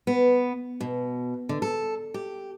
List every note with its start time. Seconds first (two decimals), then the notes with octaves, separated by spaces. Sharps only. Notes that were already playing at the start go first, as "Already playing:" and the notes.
0.07 B3
0.81 B2
1.49 D3
1.62 A4
2.14 G4